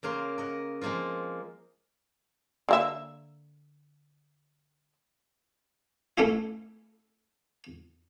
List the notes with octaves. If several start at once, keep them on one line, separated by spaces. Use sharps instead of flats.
C#3 A#3 A#4 C6
A#4 D#5 F#5
F3 G#3 A#3 C4 F4
D3 A#3 E5
A3 C#4 E4